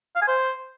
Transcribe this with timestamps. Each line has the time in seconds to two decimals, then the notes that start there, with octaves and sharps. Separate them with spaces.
0.16 F5
0.22 G#5
0.28 C5